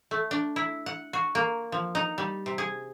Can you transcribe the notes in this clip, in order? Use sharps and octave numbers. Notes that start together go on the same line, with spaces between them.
A3
D4
E4
F#5
F#4
A#3
F3
D#4
G3
C3
G#4